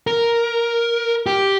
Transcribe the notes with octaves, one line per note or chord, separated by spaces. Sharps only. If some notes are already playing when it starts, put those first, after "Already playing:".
A#4
G4